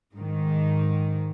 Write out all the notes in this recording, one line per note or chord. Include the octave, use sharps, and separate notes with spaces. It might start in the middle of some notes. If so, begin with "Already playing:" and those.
G#2 D#3